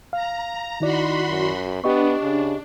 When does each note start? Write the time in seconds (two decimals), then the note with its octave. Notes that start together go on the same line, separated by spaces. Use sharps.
0.13 F5 A#5
0.81 D#3 D#4 E4 F#4 D5 B5 C6
1.28 F#2
1.84 B3 D4 G4 D#5 C#6
2.22 C#3